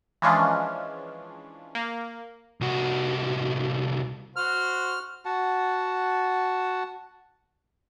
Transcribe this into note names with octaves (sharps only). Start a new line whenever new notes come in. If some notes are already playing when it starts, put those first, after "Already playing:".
E3 F3 G#3 C#4 D4 F4
A#3
C2 F#4
F#4 C5 F6
F#4 F#5 A5